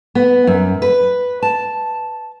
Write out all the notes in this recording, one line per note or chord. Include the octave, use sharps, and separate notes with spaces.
B3
F#2
B4
A5